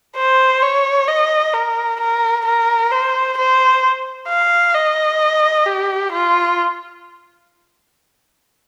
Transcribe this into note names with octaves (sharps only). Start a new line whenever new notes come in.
C5
C#5
D#5
A#4
A#4
A#4
C5
C5
F5
D#5
G4
F4